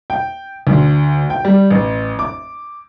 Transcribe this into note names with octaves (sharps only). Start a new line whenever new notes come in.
G5
D2
G5
G3
A1
D6